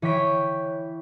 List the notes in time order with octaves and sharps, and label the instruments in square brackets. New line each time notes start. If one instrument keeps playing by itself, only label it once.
[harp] E3 C#5 G5 B6 D7